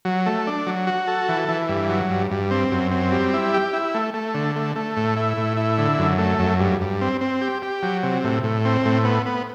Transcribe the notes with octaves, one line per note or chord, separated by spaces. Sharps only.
F#3
A3
D4
F#3
F#4
A4
E3
E3
G2
F#3
G2
G2
C4
F#2
C4
G3
E4
G4
E4
A3
A3
D3
A3
A3
A2
E4
A2
E4
D3
F#2
A3
F#2
G2
G2
C4
C4
G4
G4
F#3
C3
A2
A2
C4
A2
B3
B3